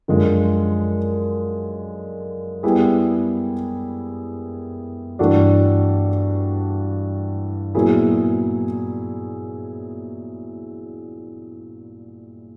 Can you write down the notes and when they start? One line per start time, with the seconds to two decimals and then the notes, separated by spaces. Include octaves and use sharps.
0.08 F#2 D3 F3 G#3
2.63 G3 B3 E4 G#4
5.19 G2 E3 A3 D4 F#4
7.75 A#2 F#3 B3 E4 G#4